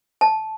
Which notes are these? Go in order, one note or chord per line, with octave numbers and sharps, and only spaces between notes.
A5